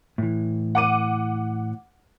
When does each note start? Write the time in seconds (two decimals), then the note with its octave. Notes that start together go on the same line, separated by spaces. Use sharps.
0.18 A2 E3
0.75 F#5 D6 D#7